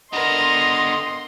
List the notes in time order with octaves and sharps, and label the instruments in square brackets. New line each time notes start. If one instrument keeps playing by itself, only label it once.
[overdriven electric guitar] D3 B3 [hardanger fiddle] A#4 [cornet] D#5 [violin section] C6